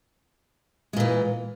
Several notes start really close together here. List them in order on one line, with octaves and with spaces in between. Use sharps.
G#3 A#2 E3